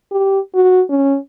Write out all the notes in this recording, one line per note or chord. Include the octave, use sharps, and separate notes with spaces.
G4
F#4
C#4